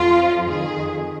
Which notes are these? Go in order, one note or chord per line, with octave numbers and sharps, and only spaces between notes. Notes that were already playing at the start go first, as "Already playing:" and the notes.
Already playing: F2 F3 F4
F2 D#3 G#4